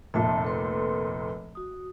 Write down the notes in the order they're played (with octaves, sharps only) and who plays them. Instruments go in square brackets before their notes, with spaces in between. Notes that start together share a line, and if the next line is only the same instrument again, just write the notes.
[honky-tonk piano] F1 A#2 [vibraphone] E5 A5
[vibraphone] A4 B4 C6
F#4 D#6